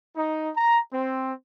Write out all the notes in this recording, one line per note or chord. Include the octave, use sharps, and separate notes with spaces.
D#4
A#5
C4